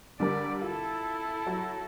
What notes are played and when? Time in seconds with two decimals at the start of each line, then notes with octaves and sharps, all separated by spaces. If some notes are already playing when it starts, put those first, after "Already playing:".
0.20 D3 G3 A#4 D5
0.61 E4 F4 A4
1.46 F#3